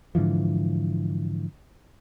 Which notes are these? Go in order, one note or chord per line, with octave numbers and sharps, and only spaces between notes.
G#2 D3 E3 F3